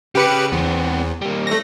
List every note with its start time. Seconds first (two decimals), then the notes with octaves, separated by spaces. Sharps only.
0.15 C#3 G4 B4 C#7
0.52 E2 B3 C4
1.22 G3 A#3
1.47 A3 A#6